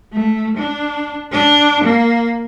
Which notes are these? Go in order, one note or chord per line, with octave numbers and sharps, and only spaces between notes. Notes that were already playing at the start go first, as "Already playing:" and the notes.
A3
D4
D4
A#3